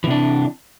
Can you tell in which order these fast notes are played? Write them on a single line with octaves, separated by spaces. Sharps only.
E3 C3 D4